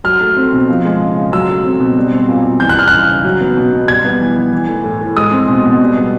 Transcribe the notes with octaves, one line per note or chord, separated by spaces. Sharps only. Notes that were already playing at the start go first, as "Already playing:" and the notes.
F#3 F6
A3
C4
B2
F3
G#3
C#3
C#3
F#3 E6
A3
C4
B2
G3
C4
A#2
A#2
E3 G6
F#6
G3 F6
C#3 F#6
C#3
F#3
B3
B2
B2
G3 G#6
B3
E3
E3
E3
A3
A2
A2
G#3 D#6
C4
B2
B2
G3
B3